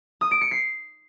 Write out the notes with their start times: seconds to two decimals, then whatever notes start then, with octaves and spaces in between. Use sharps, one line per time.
0.21 D#6
0.31 D7
0.41 C#7
0.51 C7